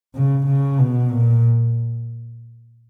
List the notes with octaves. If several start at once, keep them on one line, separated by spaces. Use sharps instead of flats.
C#3
C#3
B2
A#2